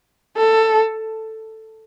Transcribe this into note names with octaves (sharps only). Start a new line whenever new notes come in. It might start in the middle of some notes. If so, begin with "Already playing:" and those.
A4